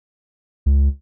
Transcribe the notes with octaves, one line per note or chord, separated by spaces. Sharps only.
C#2